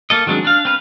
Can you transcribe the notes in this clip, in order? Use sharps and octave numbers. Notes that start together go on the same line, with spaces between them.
A#3 A4 D#5
D#3 F#3 G#3 C4 D4
D4 F5
C4 B4 F5